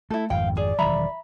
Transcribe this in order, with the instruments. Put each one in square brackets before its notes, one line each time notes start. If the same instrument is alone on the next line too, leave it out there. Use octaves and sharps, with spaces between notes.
[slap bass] A3 [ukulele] E4 A4
[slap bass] G#1 F2 G#2 [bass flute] F5 [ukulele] G5
[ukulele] G#4 [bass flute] D5
[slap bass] E1 D#3 F#3 [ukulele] E5 A#5 B5